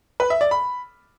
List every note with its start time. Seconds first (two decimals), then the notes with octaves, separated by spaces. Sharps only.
0.20 B4
0.30 E5
0.41 D5
0.51 B5